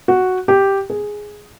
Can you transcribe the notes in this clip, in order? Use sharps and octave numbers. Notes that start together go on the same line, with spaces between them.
F#4
G4
G#4